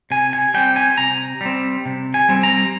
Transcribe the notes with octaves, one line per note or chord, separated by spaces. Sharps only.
C3 G#5
G#5
G3 C4 G5
G#5
C3 A#5
G3 C4
C3
G#5
G3 C4
A#5